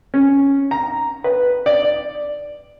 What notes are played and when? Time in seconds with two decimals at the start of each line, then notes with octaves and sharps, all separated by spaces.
0.14 C#4
0.71 A#5
1.24 B4
1.66 D5